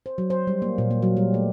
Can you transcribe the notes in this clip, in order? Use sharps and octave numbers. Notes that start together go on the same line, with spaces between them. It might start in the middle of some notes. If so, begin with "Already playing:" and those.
C5
F#3
C5
G3
A#3
A#2
A#3
F#3
G3
A3